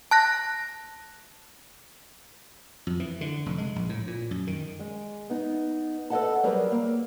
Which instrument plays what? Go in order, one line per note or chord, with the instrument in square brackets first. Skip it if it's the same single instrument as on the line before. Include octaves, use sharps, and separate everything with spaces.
[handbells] A5 F#6 A#6
[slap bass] F2
E3
D3
F1
G#3
A#1
A2
A#2
F#2
D#3
[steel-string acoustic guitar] G#3
B3 D#4
A4 B4 C5 D#5 F#5 A5
F#3 G3 G#4 A#4 B4
A#3